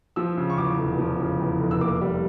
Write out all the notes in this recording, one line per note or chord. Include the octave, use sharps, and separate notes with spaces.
F3 E6
C#3
C#6
E2 D6
F1
F3
C#3
E2
F1
E6
A#3 D6
G3